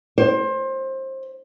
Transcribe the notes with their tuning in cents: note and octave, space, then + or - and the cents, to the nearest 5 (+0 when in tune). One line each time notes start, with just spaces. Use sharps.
C5 +25